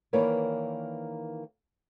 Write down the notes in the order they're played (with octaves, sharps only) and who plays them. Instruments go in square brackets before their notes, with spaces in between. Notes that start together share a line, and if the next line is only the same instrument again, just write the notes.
[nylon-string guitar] D#3 E3 A#3 B4 C#5 D5